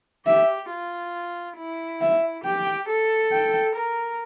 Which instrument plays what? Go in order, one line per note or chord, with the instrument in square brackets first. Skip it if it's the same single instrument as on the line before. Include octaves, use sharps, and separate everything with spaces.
[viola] G4 [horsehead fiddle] E5
[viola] F4
E4
[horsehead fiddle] E5
[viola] G4 [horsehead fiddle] G5
[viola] A4
[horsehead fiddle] G5
[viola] A#4